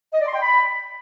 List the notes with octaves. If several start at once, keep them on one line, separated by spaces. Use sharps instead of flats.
D#5
D5
C6
G5
B5